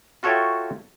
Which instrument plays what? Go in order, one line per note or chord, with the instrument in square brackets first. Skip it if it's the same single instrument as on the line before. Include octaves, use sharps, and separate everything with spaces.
[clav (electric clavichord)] F4 F#4 A4 C#5 E5 G5